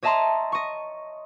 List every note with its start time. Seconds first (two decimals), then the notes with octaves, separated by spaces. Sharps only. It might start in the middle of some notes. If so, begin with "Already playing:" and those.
0.03 C#5 D#5 E5 A5 A#5 C6
0.52 D#5 C#6